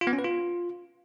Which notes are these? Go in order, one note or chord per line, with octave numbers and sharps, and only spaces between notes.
F4
B3
C#4
B4
F4